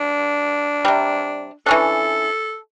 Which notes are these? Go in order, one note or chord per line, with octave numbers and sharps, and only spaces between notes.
D4
C3 G3
E3 C#4 D4 A4